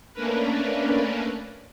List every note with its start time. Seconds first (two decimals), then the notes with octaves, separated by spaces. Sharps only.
0.14 A3 A#3 C#4 D4 A#4 B4